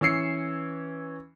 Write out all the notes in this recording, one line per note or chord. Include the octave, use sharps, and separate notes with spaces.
E3 C#4 E6 C7 C#7